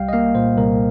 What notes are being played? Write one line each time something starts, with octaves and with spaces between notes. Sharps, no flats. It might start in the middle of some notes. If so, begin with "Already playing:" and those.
Already playing: C2 G3 F5 G5
D#5
A#3 F5
A#2 C5
C2 A#4